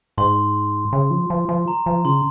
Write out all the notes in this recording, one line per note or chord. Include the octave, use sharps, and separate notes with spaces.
G#2 C6
C#3
F3
F3
F3
A#5
F3
C#3 C6